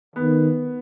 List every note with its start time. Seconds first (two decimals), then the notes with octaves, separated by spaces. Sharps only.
0.16 D#3 B3